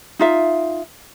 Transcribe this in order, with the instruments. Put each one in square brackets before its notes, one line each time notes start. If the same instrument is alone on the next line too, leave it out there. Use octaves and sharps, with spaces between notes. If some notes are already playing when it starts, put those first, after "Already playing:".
[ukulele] D#4 F4 E5